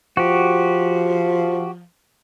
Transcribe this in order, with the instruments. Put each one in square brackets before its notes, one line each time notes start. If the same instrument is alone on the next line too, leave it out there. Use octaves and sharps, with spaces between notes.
[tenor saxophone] F3 [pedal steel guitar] F#4 G4